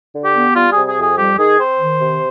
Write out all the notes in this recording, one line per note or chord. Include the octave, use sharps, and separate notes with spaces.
D3
G4
B3
G3 F4
C3 G#4
G#4
F2 G#4
G3 G4
D#3 G#4
C4 C5
D#3
C3